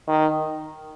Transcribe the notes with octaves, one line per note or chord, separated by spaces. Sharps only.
D#3